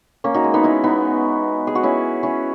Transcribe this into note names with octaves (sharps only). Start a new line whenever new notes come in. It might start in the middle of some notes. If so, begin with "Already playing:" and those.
A#3 C#4
D#4 F#4
G#3
B3 D#4
C#4 E4
B3 D#4
G#4
F#4
C#4 E4
C#4 E4